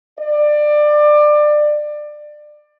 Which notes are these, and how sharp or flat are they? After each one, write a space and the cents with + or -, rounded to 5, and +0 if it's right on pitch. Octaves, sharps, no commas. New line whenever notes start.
D5 +25